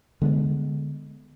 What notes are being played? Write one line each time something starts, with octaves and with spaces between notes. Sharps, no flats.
D3 G#3 A#3 B3